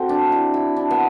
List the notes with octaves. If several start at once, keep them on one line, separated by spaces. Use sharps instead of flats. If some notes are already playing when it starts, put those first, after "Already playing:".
Already playing: C4 F#4 A4
D4
E4
E4
D4
B3